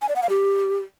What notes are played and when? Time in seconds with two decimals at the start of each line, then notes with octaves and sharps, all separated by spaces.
0.02 G#5
0.09 D5
0.16 F#5
0.23 F5
0.30 G4